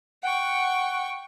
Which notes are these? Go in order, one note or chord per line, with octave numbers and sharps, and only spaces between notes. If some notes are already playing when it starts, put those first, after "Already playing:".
F#5 G5 C#6